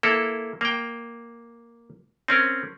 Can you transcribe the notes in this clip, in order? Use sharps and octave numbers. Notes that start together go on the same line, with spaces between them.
A#3 E4 A4
A#3 G5
C4 C#4 A#4